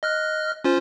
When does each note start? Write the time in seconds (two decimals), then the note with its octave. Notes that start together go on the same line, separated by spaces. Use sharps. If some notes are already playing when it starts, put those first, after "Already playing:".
0.03 D#5 F6 F#6
0.64 C#4 F4 C5